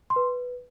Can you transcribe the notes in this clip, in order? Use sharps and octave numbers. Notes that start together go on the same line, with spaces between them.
C6
B4